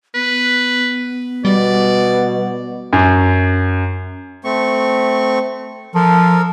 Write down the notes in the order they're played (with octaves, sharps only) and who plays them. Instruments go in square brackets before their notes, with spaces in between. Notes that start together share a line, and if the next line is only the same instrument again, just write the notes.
[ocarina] B3 [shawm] B4
[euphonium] B2 [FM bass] G3 [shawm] D5
[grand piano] F#2
[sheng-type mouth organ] A3 C4 C#6
[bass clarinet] F3 [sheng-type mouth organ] A4 A#4